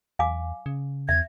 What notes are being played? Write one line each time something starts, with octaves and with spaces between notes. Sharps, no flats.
E2 F5 G#5 D6
C#3
E2 E5 G#6